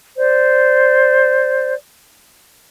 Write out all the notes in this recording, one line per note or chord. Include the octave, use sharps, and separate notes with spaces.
C5 D5